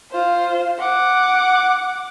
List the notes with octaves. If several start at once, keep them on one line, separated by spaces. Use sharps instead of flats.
F4 C5
F#5 D6